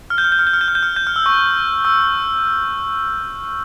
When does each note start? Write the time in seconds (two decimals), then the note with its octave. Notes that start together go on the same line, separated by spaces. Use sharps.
0.10 F6
0.18 G6
0.24 F6
0.32 G6
0.39 F6
0.47 G6
0.53 F6
0.61 G6
0.68 F6
0.75 G6
0.83 F6
0.96 G6
1.07 F6
1.16 E6
1.26 C#6
1.85 E6